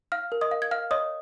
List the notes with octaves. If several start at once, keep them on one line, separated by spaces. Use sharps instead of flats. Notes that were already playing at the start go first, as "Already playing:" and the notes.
F5 F6
A#4
D#5 D#6
F5
G#6
F5 F6
C#5 D#5 D#6